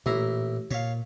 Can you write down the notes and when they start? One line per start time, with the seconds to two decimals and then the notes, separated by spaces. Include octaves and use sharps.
0.06 A1 A#2 E4 A#5
0.71 A#2 C#5 F5